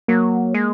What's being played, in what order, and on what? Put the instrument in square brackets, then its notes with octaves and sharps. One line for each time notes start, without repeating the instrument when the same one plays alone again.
[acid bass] F#3 [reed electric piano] A#3
[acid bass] G#3